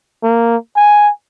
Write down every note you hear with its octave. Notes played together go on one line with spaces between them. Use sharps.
A#3
G#5